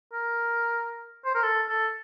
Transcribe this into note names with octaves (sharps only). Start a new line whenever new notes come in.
A#4
C5
A#4
A4
A4